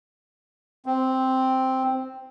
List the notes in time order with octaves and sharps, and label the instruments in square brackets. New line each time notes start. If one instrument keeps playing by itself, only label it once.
[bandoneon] C4